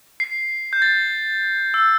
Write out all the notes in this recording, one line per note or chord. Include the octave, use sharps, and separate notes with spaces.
C7
G6
A6
E6